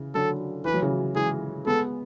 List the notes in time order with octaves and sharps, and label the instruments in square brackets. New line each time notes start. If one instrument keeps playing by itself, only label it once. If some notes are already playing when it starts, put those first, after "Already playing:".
Already playing: [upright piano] C#3 E3
[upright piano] D3 F#3 [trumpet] A4
[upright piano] E3 [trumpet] B4
[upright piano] F#3
C#3 E3
[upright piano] E3 G#3 [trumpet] G#4
[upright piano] G#3 B3 [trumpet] A4